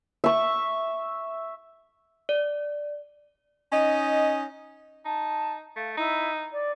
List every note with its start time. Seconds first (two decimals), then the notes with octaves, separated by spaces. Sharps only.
0.24 E5 C#6
2.29 D5
3.72 C#4 D#4 D#5
5.05 D#4 A5
5.76 A3 F5
5.97 D#4 E4
6.52 D5